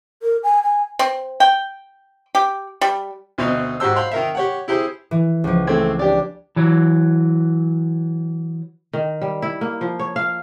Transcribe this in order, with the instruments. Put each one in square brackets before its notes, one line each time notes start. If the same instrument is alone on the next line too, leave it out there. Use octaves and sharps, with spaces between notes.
[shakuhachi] A#4
G#5
G#5
[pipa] C4
G5
G4
G3
[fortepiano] D2 B2 C4 D#4
G#2 F#4 G4 C5 E6
C5 F5 B5 C6
D#3 A#4 E5
G4 C#5 F#5
E4 G4 G#4 C5
[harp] E3
C#2 F3
[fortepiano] A3 C4 [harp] G#6
[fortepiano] D4 G4 D5
[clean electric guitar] E3 F#3
[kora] D#3
G3
E4
A#3
F3
C#5
F5